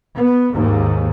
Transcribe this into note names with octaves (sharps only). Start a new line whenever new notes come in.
B3
D#2 G#2